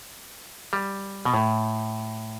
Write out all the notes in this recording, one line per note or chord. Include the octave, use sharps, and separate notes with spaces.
G3
B2
A2